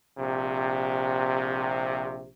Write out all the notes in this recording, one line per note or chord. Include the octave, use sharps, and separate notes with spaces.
A#1 C3